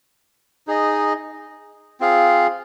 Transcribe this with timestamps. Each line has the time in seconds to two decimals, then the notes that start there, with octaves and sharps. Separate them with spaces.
0.67 D#4 G#4 D#5
2.00 C4 F4 G#4 F5